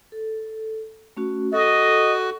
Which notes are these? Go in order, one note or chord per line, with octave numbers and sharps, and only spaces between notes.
A4
A3 C#4 F#4
F#4 A4 D#5